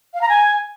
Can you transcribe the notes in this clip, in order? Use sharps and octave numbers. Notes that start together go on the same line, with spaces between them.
F5
A#5
G#5